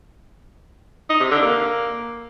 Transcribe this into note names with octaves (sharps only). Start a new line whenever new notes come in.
D#4
C3
D3
A#3